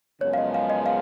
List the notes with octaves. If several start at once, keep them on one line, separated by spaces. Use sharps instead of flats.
F#2 C#3 F3 G#3 B3 C#5
F5
D#5
F5
D#5
F5